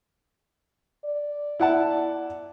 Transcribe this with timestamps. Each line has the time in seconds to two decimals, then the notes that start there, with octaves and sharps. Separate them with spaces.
1.05 D5
1.60 E4 F#5 A5